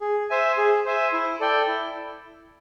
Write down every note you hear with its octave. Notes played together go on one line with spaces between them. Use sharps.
G#4
C5 E5 G#5
G#4
C5 E5 G#5
E4
A4 D5 G5
E4